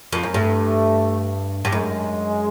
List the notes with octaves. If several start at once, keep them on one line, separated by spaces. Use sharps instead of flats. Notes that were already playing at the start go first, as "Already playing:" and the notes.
F2
F#2
G2 A3
G2
F#2 G#3